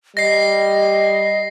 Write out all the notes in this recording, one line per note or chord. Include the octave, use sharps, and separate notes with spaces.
G3 D#5 A#6 C7